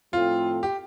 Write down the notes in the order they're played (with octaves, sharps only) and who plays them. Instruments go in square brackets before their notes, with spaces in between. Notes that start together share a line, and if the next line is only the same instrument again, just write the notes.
[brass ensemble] A2 F3 A3 C4 [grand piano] F4
[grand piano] G4